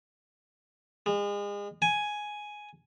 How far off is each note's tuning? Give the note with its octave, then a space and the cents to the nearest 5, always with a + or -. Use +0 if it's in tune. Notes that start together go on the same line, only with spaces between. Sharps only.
G#3 -35
G#5 +5